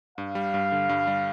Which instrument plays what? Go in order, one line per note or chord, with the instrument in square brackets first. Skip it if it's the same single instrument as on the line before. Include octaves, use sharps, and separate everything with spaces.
[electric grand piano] G2 [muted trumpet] F5
[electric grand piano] G3
G2
D3
G2
G3